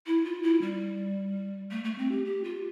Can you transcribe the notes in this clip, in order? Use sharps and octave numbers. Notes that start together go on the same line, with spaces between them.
E4
F4
E4
G3
A3
A3
C4
G4
G4
F4